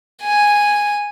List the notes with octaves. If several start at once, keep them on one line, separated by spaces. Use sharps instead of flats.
G#5